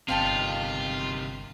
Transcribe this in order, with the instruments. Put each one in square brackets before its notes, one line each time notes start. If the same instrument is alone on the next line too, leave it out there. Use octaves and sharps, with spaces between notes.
[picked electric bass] G1 C4 [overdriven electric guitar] C3 D#3 [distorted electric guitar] F4 [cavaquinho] F5 G5 A5